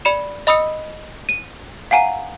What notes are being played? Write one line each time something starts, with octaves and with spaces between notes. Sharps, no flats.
D5 B5 C#7 E7
D#5 B5 D#6 E6 C#7
D#7
F5 F#5 G#5 A#5 D#7